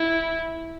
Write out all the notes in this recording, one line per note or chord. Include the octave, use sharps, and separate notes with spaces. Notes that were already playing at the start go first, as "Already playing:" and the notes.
Already playing: E4